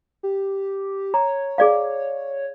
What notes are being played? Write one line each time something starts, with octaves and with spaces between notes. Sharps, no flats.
G4
C#5 A#5
G#4 D5 F5